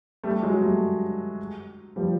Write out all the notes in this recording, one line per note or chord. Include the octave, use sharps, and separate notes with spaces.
G3 A3
F#3 G#3
G3 A3
F3 G3